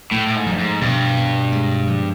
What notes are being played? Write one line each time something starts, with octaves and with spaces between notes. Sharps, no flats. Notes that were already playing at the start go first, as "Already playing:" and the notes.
A2 A3
A2
G#2
G2 F3
G#2
G2 B2
B2
G#3
F3